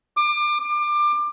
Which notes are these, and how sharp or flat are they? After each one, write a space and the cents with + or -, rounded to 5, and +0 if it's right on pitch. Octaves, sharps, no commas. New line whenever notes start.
D6 +30
D6 +25